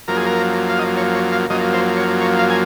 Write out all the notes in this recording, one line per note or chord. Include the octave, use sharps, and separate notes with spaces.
F#2 F3 A#3 A#4
G#4
A#4
F5
D#5
C#5
C#5
F5
F#2 F3 A#3 D#5
C5
C#5
C#5
F5
G#5